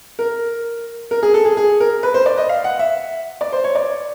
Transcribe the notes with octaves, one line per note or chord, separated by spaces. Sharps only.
A#4
A#4
G#4
A4
G#4
G#4
A#4
B4
C5
D5
D#5
F5
F#5
E5
D5
C5
C#5
D5